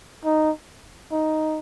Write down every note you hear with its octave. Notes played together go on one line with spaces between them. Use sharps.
D#4
D#4